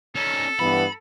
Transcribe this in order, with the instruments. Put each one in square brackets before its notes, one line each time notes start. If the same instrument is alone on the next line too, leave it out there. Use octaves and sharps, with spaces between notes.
[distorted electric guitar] C#4 D#4 [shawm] A4
[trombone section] G2 E3 B3 [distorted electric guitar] B5